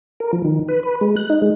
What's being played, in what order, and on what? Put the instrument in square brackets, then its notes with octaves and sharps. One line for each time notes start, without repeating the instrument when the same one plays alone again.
[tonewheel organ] A#4
F3
D#3
B4
B4
G#3
F#6
D#4
G#3